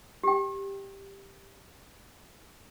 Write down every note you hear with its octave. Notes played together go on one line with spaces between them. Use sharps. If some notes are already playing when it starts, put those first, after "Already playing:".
G4 G5